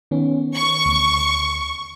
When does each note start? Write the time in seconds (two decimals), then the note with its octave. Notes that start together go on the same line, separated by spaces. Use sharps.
0.11 D#3 B3 C#4
0.55 C#6
0.85 D2